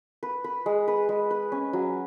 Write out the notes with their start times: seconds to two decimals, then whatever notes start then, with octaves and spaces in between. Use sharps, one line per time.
0.23 B4
0.44 B4
0.66 G#3
0.88 B4
1.09 G#3
1.31 B4
1.52 C#4
1.73 F#3